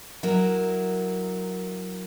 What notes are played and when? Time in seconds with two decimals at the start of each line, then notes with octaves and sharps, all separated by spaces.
0.23 F#3 E4 A#4